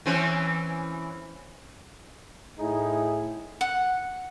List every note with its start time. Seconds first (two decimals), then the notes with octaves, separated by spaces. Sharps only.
0.06 E3 C4 C#4
2.58 A2 D#4 E4 G#4
3.61 F#5